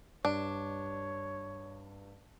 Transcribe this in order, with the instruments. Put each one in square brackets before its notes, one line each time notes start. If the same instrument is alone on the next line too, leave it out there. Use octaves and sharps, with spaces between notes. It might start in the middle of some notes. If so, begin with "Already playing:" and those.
[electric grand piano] G2 [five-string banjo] D4 [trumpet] C#5